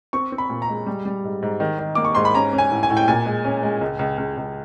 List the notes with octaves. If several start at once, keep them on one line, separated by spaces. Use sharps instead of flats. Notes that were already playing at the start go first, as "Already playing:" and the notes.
C4 C#6
C4
B5
A#2
A#5
G#3
G3
G3
G#2
G#2
D#3
D#3
A#3 D6
C#6
G#2 C6
B5
C#4 A#5
C#4
G#5
A2
G#5
A2
G5
A#2 G#5
G#3
C#4
G#3
C#2
C#2
C#2
C#2